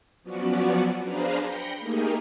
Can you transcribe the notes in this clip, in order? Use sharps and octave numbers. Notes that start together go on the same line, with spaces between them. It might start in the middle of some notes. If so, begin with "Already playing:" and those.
F3 F#3 B3 C#4 F#4 D5
D4 G#4 B4 C5 F5 A#5
G5 B5 G6 A#6 C#7
A3 A#3 D#4 G4 G#4 A#4